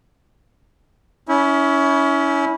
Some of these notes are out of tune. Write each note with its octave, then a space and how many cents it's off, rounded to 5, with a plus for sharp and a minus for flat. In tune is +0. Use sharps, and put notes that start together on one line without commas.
C#4 +20 E4 -25